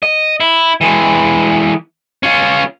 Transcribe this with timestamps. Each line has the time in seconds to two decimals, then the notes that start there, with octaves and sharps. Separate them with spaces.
0.03 D#5
0.40 E4
0.81 E3 G#3
2.23 C#4 F4